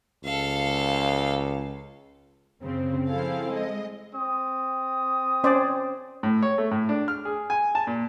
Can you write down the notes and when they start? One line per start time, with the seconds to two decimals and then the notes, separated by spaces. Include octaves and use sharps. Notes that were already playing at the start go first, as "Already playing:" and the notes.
0.24 C#2 A4 F5
2.61 F#2 C#3 C4
3.08 F3 C4 E4 G#4 A4 F5
3.52 G#3 D#5
4.14 C4 D#6
5.44 C#4 C5 D5
6.23 A2
6.43 C#5
6.58 A3
6.71 A2
6.89 D4
7.08 F6
7.25 G#4
7.50 G#5
7.75 A5
7.87 A#2